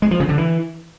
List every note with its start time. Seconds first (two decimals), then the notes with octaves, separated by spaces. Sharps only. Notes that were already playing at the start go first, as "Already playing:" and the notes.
0.02 G#3
0.11 F3
0.20 C#3
0.29 D3
0.38 E3